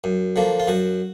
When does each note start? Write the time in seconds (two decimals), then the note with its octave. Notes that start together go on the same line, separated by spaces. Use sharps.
0.04 F#2
0.36 D3 F3 A#3
0.60 F4
0.68 F#2 F#4